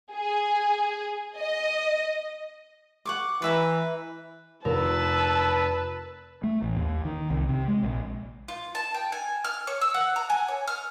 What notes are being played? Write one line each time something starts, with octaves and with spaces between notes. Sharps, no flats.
G#4
D#5
F#5 C#6 D6
E3 B4 E5 A#5
F1 F4 A#4 B4 A5 E6
A3
A1
D#2
D#3
C2
C3
G#3
A#1
F4
A5
G5
G#5
F6
C#5
E6
F#5
A#5
G#5
C#5
F6